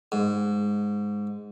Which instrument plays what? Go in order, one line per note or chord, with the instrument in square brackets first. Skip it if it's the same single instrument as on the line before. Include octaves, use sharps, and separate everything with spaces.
[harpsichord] G#2